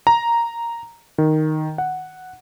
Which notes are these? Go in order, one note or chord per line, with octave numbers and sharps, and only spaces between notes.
A#5
D#3
F#5